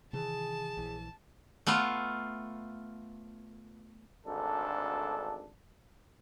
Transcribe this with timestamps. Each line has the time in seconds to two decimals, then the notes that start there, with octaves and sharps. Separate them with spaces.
0.13 C3 D#3 E3 G#4 A5
0.77 A#1 E3
1.67 A3 B3 F4 F5
4.26 G#1 D2 D4 A4